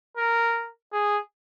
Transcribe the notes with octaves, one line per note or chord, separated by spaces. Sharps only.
A#4
G#4